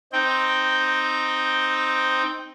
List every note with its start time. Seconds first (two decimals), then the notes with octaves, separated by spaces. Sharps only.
0.13 C4 D#4 G5